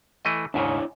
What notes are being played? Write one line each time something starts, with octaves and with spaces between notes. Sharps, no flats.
E3 A3 D#5
D#2 G#2 C#3 D4 E4 C#5